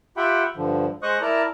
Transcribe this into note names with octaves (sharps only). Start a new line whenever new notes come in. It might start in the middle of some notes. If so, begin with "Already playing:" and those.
F4 G4 E5 F#5 G5 B5
G2 D3 F3
G#3 C5 D#5 C#6 D#6 F#6
E4 A#4 D5 A5 A#5